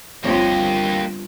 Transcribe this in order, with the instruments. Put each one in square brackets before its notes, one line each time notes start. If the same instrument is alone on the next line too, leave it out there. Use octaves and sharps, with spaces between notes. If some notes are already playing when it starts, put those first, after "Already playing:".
[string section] G1 [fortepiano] F3 C4 C#5 [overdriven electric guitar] A#3 G4